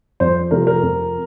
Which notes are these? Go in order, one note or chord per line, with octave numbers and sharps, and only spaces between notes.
F2 C5
C3 F3 A3 A#4
A#4
F2